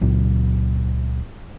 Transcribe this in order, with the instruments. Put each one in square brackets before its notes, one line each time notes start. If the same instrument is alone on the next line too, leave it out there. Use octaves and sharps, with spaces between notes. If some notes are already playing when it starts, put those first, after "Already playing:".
[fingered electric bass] C#2 A#2 F#3